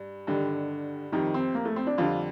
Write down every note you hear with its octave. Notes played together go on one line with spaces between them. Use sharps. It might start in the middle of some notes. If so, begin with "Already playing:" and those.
Already playing: G2
G2 D3 D#3 G3
F2 C3 D#3 G3
C4
A#3
A3
C4
D4
F2 D3 G3 D4 F4